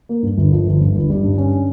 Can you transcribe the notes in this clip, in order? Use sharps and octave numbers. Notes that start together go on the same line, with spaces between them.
A#3
G2
G1
F3
G1
G2
G1
G3
G2
C#4